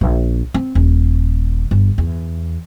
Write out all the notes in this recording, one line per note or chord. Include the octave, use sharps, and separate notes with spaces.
A#1
C4
D#1
G1
E2